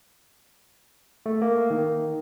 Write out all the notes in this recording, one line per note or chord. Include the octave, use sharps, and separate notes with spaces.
A3
A#3
D#3